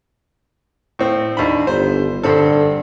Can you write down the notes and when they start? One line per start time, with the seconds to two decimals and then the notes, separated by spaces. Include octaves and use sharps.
0.99 A2 C4
1.37 D#2 D4 B5
1.67 G1 C5
2.23 G2 D3 C4 A4